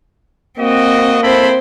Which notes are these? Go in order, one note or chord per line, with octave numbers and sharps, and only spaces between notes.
A#3 C4 F#4 D#5
C4 E4 A4 C5 B5